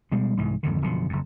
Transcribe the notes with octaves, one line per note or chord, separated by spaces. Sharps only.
B2 G3 G#3
C2 G#2 E3
G#1 F2 D3 D#3
F#1 B2 D3 F3
F#1 F2